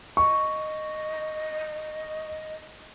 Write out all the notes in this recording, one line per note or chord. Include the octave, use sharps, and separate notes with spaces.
D#5 C#6